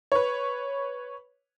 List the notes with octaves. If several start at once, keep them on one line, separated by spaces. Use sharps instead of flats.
B4 C#5